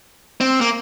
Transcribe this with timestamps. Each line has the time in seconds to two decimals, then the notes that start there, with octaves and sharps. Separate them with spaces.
0.41 C4
0.61 A#3